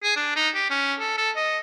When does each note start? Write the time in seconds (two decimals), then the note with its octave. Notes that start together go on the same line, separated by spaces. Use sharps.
0.03 G#4
0.16 D4
0.36 D#4
0.54 G4
0.70 C#4
1.00 A4
1.17 A4
1.36 D#5